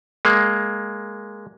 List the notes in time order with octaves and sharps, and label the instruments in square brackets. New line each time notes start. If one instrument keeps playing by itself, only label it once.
[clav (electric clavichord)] G#3 A#3